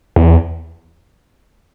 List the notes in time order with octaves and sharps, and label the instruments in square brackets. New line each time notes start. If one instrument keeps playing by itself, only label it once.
[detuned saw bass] E2